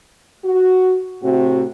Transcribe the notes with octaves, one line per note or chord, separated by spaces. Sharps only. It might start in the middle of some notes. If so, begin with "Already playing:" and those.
F#4
A2 C3 C4 F#4